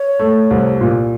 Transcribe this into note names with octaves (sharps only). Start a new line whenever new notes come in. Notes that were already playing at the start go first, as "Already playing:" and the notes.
Already playing: C#5
A3
C2
A#2